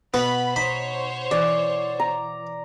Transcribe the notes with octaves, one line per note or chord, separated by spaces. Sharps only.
B2 B3 F#5 B5
D#4 C5 C#5 B5
E3 D5
A#5